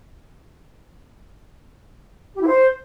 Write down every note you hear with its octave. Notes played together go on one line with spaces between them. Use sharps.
G4
E4
C5